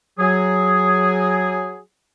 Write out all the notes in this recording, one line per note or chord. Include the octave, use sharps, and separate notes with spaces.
F#3 G#4